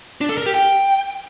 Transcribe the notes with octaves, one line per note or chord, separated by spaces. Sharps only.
D4
A4
A#4
G4
G5